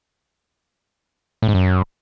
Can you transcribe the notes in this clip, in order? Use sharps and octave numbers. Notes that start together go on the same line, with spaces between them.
A2
G#2
F#2